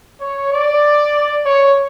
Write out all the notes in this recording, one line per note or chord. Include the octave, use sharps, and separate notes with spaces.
C#5
D5
C#5